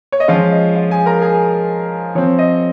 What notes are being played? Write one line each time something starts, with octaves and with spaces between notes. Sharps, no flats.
C#5
D#5
F3 G#3 C#4 F4 F5
D#5
F4 F5
G#4 G#5
A#4 A#5
G#4 G#5
F3 C4 C#5
D#5